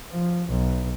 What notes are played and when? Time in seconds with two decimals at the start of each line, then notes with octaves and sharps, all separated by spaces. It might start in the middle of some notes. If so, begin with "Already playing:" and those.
0.11 F3
0.49 B1